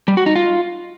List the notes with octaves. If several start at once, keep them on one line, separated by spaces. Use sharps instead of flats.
G3
F#4
D#4
F4